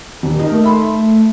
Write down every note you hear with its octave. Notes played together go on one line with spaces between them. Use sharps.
D#1
D#4 A#4
A3
E5 B5 C6